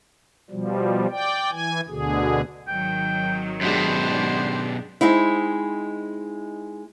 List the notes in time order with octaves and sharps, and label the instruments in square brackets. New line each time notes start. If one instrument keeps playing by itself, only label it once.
[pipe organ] B2 F3 G3
D5 G5
E3 G#5
D2 B2 D3 G#4
[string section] G#1 D#3 F#3 [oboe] G5
[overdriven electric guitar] F#2 B2 [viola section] G#3 D4 G4 [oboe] C5
[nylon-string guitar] G#3 C4 D#4 E4